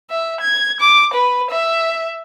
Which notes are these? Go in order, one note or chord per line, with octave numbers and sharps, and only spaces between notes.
E5
G#6
D6
B4
E5